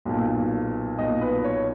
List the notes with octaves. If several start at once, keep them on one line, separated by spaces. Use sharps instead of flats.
B1 A#2
B1 A#2 D#5
B4
C#5